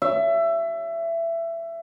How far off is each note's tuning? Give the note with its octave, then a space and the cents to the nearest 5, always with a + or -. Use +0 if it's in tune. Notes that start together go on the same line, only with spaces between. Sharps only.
E5 +20